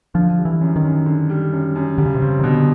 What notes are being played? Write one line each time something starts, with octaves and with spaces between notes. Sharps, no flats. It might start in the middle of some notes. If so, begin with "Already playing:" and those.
D3 F3
G3
E3
F#2
D#3
F#2
D3
G3
F#2
F#2
D3 G3
C#3
C3
C#3 C4
D#3
B2 D3